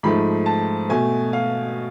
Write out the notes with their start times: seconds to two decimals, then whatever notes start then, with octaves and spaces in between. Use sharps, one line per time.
0.03 G#2 F3 A3 B5
0.46 A5
0.89 B2 A3 G#5
1.33 F5